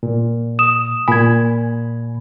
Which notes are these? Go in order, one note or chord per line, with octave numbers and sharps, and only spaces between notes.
A#2
D#6 E7
A#2 G#5 B5 G#6